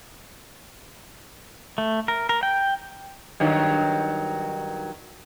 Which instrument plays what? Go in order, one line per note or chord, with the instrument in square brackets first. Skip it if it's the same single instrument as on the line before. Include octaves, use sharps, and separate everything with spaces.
[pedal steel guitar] A3
A#4
A#4
G5
[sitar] G2 D#3 F#3